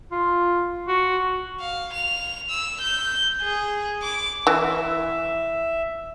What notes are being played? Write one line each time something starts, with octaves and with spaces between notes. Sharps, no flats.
F4
F#4
F5
F7
E6
G6
G#4
D6
E3 E5